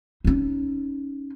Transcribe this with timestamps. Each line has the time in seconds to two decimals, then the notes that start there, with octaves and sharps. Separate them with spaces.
0.25 C#4 D#4